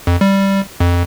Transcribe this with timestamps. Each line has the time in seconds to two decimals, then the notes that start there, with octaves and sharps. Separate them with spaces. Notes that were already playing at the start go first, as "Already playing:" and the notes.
0.07 F2
0.21 G3
0.80 F2